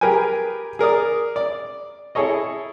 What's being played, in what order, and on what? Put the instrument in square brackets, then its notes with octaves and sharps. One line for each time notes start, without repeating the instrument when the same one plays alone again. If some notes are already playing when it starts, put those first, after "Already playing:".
[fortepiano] G4 G#4 A#4 B4 G5 G#5
G#4 A#4 D5 D#6
D5
E4 G#4 A4 C#5 D#5